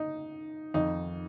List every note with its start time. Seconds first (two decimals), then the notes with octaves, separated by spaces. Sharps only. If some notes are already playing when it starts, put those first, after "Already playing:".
Already playing: D#4
0.74 F2 D#3 D#4